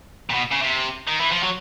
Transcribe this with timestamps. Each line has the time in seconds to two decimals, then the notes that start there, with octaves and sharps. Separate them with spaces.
0.30 A#2
0.34 B2
0.51 C#3
0.62 C3
1.08 D#3
1.21 E3
1.32 F3
1.43 F#3